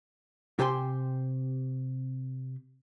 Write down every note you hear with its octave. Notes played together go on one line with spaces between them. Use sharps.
C3 G4 C5 G#5 C6